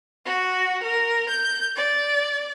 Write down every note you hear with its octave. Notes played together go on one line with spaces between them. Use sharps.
F#4
A#4
G6
D5